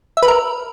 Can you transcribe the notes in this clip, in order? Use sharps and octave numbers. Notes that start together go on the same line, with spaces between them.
E5
B4
A#4